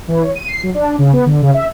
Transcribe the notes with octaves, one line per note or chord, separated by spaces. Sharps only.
E3
C#5
D#7
C7
F#3
D4
C#3
B3
D3
C#3
E5